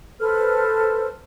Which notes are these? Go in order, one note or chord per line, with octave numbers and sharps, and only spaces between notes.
A4 B4 C5 F6